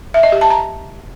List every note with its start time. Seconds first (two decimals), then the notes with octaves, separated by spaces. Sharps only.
0.14 E5
0.23 D#5
0.32 G4
0.41 A5
0.50 A#5